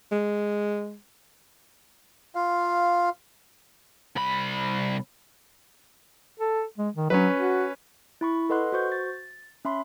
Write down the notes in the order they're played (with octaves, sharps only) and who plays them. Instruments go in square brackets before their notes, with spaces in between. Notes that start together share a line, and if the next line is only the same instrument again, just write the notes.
[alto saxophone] G#3
[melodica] F4 F5
[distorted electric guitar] C2 B5
[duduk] A4
G#3
D#3
[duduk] F#3 [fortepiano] C#4 B4
[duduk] F#4
[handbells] E4 B5 C#6
A4 B4 D#5 F#5 C6 F#6
F#4 C5 C#6 G6
A6
C#4 E5 B5 C6